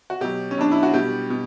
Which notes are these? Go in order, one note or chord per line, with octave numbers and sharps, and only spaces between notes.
F#4
B2 F#3 G4
C#4
B2 F#3 D4
E4
F#4
B2 G3 G4
B2